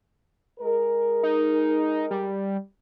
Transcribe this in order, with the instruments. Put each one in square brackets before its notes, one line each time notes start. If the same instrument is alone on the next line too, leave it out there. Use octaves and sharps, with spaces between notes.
[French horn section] G#3 A#4
[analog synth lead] D#4
G3